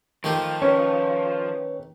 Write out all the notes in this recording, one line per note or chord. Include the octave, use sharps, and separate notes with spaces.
D#3 F3 A3 G4
C#4 B4 C#5